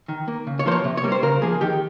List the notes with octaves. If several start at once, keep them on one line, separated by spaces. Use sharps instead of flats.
D#3
A#3
C#3
C#5
F3 A#3 C5
C#5
C3
C#5
G3 A#3
C5
C#3 A#4
F3 A#3 G#4
D#3 G4